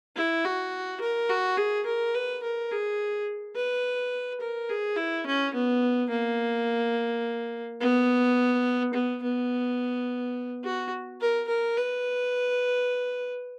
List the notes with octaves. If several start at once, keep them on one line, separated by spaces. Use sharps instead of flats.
E4
F#4
A#4
F#4
G#4
A#4
B4
A#4
G#4
B4
A#4
G#4
E4
C#4
B3
A#3
B3
B3
B3
F#4
A#4
A#4
B4